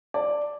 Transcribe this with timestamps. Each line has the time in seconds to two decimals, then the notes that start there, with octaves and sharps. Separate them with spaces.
0.14 D5